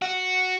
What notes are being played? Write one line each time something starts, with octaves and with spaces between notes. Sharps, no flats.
F#4